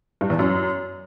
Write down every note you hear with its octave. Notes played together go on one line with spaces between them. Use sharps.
G2
E2
F#2